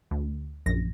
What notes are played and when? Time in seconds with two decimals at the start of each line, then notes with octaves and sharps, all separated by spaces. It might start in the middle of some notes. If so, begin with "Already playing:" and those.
0.11 D2
0.66 A#1 F#2 A#6